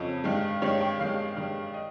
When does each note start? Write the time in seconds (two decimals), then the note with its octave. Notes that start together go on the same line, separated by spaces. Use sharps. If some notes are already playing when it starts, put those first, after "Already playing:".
Already playing: F2 C#3 F3 C#5 D#5
0.24 G2 D#3 G#3
0.62 G2 D#3 G#3 C#5
0.80 G5
0.99 G2 D#3 G#3 F5
1.37 G2 D#3 G#3
1.74 D#5